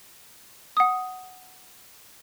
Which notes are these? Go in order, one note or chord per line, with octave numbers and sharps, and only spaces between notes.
F#5 D#6